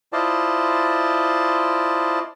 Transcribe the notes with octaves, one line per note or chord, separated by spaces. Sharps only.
E4 F4 C5 D5 D#5 A5